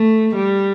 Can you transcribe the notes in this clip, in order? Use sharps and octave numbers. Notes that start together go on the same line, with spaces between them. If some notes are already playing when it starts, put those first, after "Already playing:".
Already playing: A3
G3